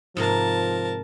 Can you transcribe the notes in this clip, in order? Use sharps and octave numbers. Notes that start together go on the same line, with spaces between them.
G#2 C3 F3 A#3 A#4 A5